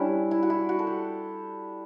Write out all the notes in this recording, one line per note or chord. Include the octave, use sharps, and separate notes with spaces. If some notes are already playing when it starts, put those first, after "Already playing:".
Already playing: G3 C#4 D4 E4
E4
F#4
E4
F#4
A4
G4